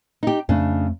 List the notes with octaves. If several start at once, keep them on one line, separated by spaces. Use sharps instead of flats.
D#4 G4
F2 C#3 A3 D4